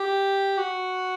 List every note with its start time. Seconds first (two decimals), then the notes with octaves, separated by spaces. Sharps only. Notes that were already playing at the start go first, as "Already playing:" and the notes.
Already playing: G4
0.58 F#4